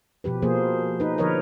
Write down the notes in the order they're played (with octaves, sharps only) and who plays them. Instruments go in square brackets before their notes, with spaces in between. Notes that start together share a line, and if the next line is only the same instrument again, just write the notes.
[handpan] B2 F3 G4 B4
B2 F3 A#3 G#4 C5
D#4 B4
D3 F3 A#4 B4 C#5 D#5